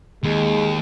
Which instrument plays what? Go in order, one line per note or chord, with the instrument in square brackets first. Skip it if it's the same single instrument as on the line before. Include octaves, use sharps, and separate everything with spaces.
[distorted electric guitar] D#2 [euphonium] G#3